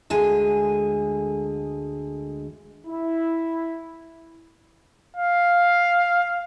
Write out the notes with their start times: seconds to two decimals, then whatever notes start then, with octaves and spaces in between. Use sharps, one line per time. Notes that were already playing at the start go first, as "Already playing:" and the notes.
0.10 D2 D3 G#3 G#5
2.86 E4
5.17 F5